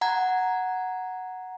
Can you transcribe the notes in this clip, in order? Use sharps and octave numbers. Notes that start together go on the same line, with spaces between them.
F#5 A#5 G#6